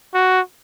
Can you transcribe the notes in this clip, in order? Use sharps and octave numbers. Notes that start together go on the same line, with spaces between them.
F#4